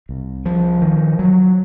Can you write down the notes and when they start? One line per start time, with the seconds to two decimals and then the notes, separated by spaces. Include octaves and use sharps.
0.09 C2
0.45 F3
0.82 D#3
1.19 F#3